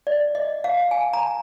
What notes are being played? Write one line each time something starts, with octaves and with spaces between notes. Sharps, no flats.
D5
D#5
F5
G#5
A#5